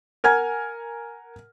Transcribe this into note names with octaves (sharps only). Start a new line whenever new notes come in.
A#4 F#5 G#5 F6 G#6